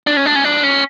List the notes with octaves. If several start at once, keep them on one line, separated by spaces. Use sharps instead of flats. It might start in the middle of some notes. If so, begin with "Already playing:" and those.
D4
C#4
D4
C#4
D4
C#4